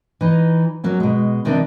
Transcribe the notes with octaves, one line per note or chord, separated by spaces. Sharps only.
E3 D#4
F#3 A#3 C#4
B2 G#3
C3 D#3 E3 G3 D4